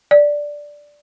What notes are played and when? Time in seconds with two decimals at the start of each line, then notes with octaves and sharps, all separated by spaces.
0.11 D5